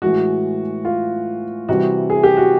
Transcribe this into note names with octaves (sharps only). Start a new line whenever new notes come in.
A2 E3 G#3 F#4
F4
C3 E3 G3 F#4
G#4
G4
F#4